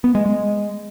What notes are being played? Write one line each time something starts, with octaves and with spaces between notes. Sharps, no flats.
B3
G#3
G#3